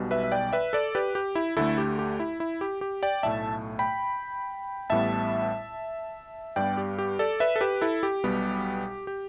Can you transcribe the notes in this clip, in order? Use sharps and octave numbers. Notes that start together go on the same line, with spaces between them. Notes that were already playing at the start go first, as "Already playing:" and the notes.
Already playing: B1 B2 G3
B4 E5
E5
D5 G5
B4 E5
A4 D5
G4 B4
G4
E4
D2 D3 A3 E4 A4
G4
G4
E4
E4
G4
G4
D5 G5
B1 A2 A3 E5 A5
G5 B5
A1 A2 G3 B3 E5 A5
G2 G3 B3 D5 G5
G4
G4
A4 D5
B4 E5
A4
G4 B4
E4 A4
G4
B1 B2 G3 B3
G4